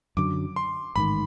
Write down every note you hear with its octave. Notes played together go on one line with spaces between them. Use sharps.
F#2 D3 F#3 D6
C6
A1 G#2 D#3 B5